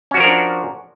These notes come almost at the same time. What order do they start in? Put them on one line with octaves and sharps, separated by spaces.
C#4 F#4 F3 A#4 D4